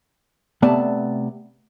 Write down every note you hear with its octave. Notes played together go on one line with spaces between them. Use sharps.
C3 A3 B3 D5 A5